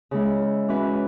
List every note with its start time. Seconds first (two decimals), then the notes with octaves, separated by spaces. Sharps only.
0.11 C#3 G#3 E4
0.68 E3 C#4 F#4 B4